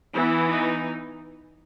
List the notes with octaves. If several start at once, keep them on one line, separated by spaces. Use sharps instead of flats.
E3 B3 E4
D#4